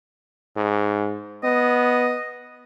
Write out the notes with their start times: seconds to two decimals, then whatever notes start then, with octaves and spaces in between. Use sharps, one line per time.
0.56 G#2
1.44 B3 D#5